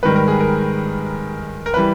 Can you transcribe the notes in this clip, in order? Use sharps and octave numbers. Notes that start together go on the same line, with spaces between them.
G#2 D#3 G3 B4
A#4
G#4
A#4
A#4
E3 G3 B4